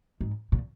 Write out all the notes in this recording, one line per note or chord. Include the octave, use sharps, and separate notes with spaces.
G#2
A#2